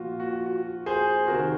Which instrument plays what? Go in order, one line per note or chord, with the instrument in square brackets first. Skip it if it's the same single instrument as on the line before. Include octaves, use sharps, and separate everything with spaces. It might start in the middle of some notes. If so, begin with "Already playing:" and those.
Already playing: [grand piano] A#2 F3 F4 F#4
F#4
F#4
G#4 C5
C3 D#3 F#4 A#4